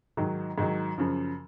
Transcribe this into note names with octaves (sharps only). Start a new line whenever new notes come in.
G#2 D#3 F#3
G#2 D#3 F#3
F#2 C#3 F3